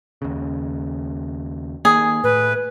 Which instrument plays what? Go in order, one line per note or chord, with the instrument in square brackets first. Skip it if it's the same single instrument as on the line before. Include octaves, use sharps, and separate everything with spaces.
[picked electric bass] D#2 C#3
[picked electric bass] D#3 A#3 [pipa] G#4
[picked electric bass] A2 [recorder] B4